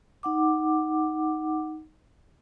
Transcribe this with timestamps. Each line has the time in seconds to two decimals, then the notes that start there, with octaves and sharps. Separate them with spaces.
0.23 D#4 F#5 D6